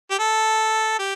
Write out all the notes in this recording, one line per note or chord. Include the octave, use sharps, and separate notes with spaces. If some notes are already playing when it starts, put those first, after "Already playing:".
G4
A4
G4